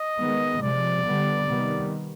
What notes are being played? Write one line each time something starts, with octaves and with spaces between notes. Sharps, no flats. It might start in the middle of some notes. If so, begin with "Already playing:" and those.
Already playing: D#5
D#3 G#3 B3
C3 F3 G#3 D5
D3 G3 B3
C3 D#3 G3 B3